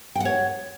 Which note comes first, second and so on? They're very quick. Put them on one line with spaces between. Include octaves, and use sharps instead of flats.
G5 F#5 C#5